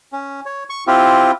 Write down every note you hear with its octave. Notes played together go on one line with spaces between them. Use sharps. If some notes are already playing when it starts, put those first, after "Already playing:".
C#4
C#5
C#6
C4 E4 F4 G4